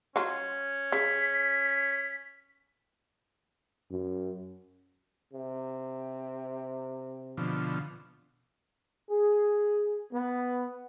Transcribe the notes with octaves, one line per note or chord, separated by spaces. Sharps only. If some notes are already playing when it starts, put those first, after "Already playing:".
F#3 C#4 F4
C#3 B6
F#2
C3
B2 D3 F3
G#4
B3